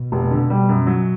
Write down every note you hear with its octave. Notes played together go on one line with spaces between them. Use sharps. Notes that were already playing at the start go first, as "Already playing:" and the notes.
Already playing: B2
F1
D3
G3
F#2
F#3